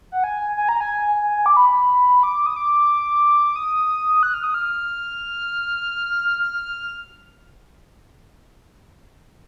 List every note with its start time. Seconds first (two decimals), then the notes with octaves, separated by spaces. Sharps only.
0.12 F#5
0.24 G#5
0.57 G#5
0.69 A#5
0.81 G#5
1.46 D6
1.57 B5
2.23 D6
2.46 D#6
2.56 D6
3.56 D#6
4.23 F#6
4.34 F6
4.44 D#6
4.54 F6